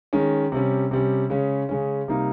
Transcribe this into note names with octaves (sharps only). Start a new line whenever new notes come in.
D#3 G#3 C#4
C3 G3 C#4
C3 G3 C#4
C#3 G#3 C#4
C#3 G#3 C#4
C3 G3 A#3 D#4